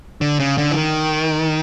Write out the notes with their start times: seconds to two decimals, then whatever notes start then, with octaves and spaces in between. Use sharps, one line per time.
0.21 D3
0.40 C#3
0.58 D3
0.71 E3
0.76 D#3